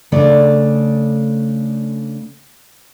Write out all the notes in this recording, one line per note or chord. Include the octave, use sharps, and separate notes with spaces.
C#3 A3 D4 D5